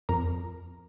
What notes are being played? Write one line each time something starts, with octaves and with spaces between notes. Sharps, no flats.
F2 A#4 A#5